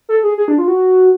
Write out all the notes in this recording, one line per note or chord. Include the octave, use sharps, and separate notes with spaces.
A4
G#4
G#4
D4
F4
F#4